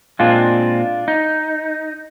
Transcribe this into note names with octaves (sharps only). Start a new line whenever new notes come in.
A#2 G#3 C4 D4 F4
D#4